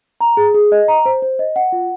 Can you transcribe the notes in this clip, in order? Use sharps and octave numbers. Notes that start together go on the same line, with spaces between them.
A#5
G#4
G#4
D#5
A#5
C5
C5
D#5
F#5
F4